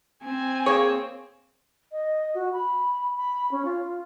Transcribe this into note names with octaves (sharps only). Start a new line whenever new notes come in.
C4 G#5
A#3 G#4 C#5
D#5
F#4
B5
B5
C#4
F4